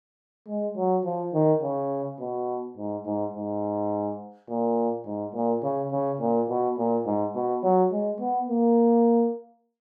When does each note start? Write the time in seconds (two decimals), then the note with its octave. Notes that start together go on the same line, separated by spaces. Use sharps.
0.48 G#3
0.76 F#3
1.05 F3
1.33 D#3
1.62 C#3
2.19 B2
2.77 G#2
3.05 G#2
3.34 G#2
4.49 A#2
5.05 G#2
5.34 A#2
5.63 C#3
5.91 C#3
6.20 A#2
6.49 B2
6.78 A#2
7.06 G#2
7.35 B2
7.63 F#3
7.92 G#3
8.20 B3
8.49 A#3